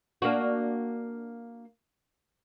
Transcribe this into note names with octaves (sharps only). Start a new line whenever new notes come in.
A#3 D4 F#4